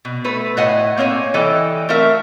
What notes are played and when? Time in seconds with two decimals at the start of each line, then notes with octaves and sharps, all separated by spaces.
0.05 B2
0.24 A3 B4
0.57 A2 D#5 F#5 G#5
0.98 A#3 C4 C#5 E5 G#5
1.34 E3 G3 A4 D#5 G5
1.89 A3 C4 A#4 E5 F5